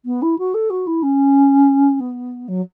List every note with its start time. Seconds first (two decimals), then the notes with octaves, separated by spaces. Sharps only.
0.05 B3
0.22 E4
0.38 F#4
0.54 A4
0.70 F#4
0.87 E4
1.02 C#4
2.00 B3
2.48 F#3